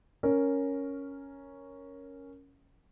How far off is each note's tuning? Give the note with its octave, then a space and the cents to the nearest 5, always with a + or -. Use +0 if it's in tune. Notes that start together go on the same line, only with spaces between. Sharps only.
C#4 +0 A#4 +0